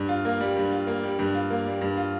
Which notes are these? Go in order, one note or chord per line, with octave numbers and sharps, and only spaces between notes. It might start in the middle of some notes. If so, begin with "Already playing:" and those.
Already playing: G2
F4
A#3
G3
G2
F4
A#3
G3
G2
F4
A#3
G3
G2
F4